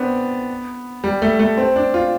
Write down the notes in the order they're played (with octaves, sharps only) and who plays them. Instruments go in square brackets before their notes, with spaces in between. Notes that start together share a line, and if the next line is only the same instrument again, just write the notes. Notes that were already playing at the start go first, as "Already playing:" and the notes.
Already playing: [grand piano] B3 C4 D4
G3
A3
A3
C4
D4
F4